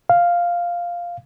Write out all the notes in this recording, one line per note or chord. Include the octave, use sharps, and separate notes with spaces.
F5